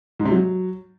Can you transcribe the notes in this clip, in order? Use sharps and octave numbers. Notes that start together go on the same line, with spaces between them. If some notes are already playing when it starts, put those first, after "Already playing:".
G#2
C3
F#3